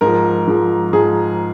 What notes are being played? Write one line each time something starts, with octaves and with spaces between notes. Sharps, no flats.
G#2 F3 A#4
G#2 F3
G#2 F3 G#4